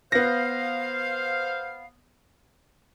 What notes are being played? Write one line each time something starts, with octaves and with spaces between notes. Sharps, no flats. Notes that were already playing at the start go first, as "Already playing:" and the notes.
B3 C5 F5 A#6